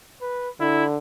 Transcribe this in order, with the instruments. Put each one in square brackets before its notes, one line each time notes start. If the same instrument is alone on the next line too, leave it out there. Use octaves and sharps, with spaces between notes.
[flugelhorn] B4
[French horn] D3 [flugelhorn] E4